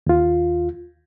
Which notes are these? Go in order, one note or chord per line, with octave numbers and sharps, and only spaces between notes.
D#2 F4